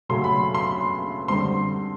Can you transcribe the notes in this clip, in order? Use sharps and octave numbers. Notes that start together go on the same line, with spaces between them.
C#3 F#3 A3 C#4 C6
B5
C6
D3 G3 C4 C6